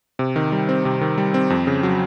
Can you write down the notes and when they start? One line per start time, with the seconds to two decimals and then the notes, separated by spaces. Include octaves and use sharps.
0.19 C3
0.36 D#3
0.52 G3
0.69 C4
0.85 C3
1.01 D#3
1.18 G3
1.34 C4
1.50 F2
1.67 C#3
1.83 F#3